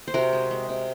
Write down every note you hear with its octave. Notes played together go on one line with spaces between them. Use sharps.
C5
C3 F#4 A#4
G#3
G#3
C3